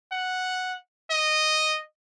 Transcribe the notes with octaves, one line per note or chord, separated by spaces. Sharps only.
F#5
D#5